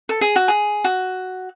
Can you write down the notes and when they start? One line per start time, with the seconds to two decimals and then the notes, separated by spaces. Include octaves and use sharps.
0.09 A4
0.21 G#4
0.36 F#4
0.48 G#4
0.84 F#4